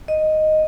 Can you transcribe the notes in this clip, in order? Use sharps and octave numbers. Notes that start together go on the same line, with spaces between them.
D#5